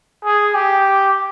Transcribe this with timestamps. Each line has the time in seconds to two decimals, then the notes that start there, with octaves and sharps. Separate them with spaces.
0.24 G#4
0.55 G4